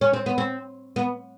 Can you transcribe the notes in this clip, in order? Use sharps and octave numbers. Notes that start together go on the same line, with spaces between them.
C#4
C4
B3
C4
B3